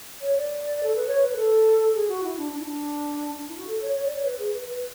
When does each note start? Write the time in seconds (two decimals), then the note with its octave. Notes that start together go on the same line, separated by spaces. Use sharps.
0.21 C#5
0.36 D5
0.83 A4
0.96 B4
1.08 C#5
1.22 B4
1.37 A4
1.94 G#4
2.08 F#4
2.23 E4
2.38 D4
2.52 D4
2.60 E4
2.66 D4
3.38 D4
3.49 E4
3.58 F#4
3.67 A4
3.82 C#5
3.95 C#5
4.05 D5
4.15 C#5
4.25 B4
4.39 G#4
4.54 B4
4.68 B4